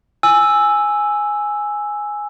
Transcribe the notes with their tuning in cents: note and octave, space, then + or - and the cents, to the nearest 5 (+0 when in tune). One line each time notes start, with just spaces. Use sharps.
G#5 +0 E6 +0